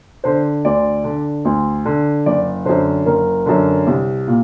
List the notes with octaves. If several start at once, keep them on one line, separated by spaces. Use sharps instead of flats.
D3 C5
D2 D5
D3
D2
D3
F#1 D5
F#2 D3 C5
F#1 A#4
F#2 D3
C2
A#2